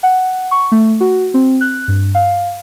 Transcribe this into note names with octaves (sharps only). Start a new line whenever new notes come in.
F#5
C#6
A3
F#4
C4
F#6
G2
F5